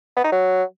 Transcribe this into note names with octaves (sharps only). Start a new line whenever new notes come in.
B3
D#4
F#3